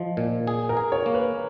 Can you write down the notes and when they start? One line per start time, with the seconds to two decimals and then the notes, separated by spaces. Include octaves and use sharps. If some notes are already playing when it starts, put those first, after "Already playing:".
Already playing: F3 D#4
0.17 A#2
0.47 G#4
0.69 A#4
0.77 G#4
0.92 C#5
1.06 A#3
1.14 B4